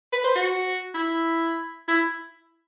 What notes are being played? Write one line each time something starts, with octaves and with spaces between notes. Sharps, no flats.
B4
C5
F#4
E4
E4